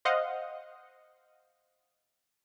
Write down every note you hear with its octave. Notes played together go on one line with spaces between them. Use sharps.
C5 D#5 F5 F#5